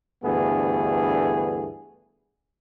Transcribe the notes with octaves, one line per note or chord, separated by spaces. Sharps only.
D2 G2 E3 A3 B3 G#4